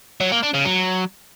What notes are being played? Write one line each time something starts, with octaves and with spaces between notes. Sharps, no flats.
F#3
A#3
D4
C#3
F#3